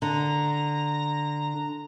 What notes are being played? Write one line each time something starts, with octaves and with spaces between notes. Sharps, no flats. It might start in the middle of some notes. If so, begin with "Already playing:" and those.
D3 A#5